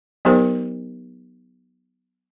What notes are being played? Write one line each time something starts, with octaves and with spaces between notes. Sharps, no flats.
F#3 B3 D#4 G4 A#4 C5